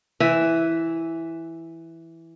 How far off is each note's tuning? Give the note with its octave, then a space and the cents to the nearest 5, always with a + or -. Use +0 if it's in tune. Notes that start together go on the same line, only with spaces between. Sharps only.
E3 +0 C5 -30 E5 +0